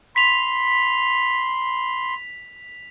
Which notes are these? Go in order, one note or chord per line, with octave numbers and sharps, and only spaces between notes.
B5 C6 B6 F7